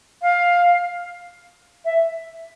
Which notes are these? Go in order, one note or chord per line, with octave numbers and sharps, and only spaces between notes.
F5
E5